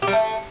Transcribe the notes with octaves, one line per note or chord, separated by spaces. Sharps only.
G4
G3
A3